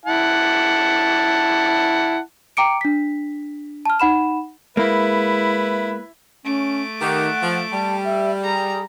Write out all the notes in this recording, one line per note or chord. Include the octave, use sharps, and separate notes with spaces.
E4 F#5 A5
G5 A#5 D6 C#7 D7
D4 B6
A5 F6
D#4 F#5 B5 E7
G#3 A#3 E4 B4
A3 C#4 D6
D#3 G4 F#5
F3
G3 A5
E5
G#4 A#5